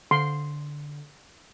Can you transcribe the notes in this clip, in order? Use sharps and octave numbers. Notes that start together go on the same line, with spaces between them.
D3 C6